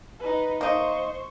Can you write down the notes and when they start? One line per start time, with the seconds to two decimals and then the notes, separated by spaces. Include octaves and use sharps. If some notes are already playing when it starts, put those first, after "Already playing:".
0.19 D#4 B4
0.61 A#3 D#4 C5 C#6